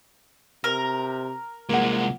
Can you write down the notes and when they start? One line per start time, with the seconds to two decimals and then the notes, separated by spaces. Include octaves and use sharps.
0.64 C3 A#4
1.69 C2 F3 G#3 A#3 F#5